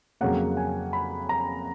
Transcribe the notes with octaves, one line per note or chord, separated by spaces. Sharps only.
F2 C#3 F#3 A#3 F#5
G#5
B5
A#5